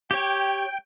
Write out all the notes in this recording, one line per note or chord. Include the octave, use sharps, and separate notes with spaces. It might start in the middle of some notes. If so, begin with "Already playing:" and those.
G4 C#5 G5